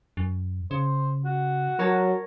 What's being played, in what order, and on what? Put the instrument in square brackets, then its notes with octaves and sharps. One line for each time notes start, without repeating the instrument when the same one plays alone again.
[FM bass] F#2
[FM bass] C#3 [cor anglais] C5
[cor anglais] F#4
[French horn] F#3 [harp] A#4 C#5 A5